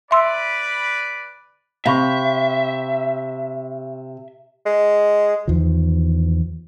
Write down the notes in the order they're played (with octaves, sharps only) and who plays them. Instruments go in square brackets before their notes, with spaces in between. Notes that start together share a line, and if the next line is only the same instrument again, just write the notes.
[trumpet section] B4 D5 B5 [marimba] E5 C6 E6
[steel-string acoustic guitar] C3 [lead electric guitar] E5 [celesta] F5 B5 C#6
[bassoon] G#3
[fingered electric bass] E2 D#3 F3